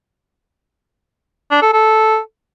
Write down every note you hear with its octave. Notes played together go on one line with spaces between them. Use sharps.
D4
A4
A4